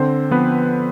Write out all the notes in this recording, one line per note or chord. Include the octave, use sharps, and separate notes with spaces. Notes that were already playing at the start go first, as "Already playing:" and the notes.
Already playing: D3 C4 C5
F3 B3 B4